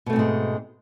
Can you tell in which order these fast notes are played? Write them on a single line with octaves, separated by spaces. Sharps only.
B2 A3 C4 G#2 G#3